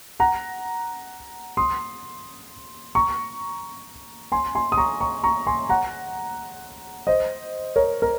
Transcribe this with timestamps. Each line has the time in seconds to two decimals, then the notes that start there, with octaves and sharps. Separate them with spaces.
0.20 F#5 A#5
1.57 C6 D#6
2.95 A#5 C#6
4.32 G#5 C6
4.55 G#5 C6
4.72 D#6
4.77 A#5 C#6
5.01 A#5 C#6
5.24 A#5 C#6
5.47 G#5 C6
5.69 F#5 A#5
7.07 C5 D#5
7.76 A#4 C#5
8.02 A#4